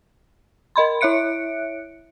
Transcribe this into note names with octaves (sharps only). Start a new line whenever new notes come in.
A#4 D#5 B5 C6
E4 C#5 E5 F#6 C#7 D7